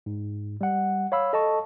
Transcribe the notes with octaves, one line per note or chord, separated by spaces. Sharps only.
G#2
G3 F#5
C#5 F5 B5 E6
A4 D#5 A5 C#6